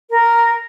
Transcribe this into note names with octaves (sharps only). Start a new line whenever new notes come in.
A#4